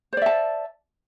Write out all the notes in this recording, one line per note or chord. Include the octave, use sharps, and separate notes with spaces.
C5 D5 E5 A5